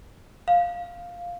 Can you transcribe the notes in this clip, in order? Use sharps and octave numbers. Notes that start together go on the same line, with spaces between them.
F5